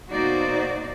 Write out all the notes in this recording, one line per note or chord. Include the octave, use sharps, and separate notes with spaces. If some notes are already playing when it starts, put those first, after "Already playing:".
B2 A#3 D#4 F#4 C5 D5